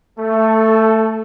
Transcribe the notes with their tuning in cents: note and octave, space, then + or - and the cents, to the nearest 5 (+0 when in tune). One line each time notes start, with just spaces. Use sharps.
A3 +10 A4 -15